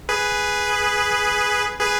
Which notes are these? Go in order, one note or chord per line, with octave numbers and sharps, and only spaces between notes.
G#4 B4
G#4 B4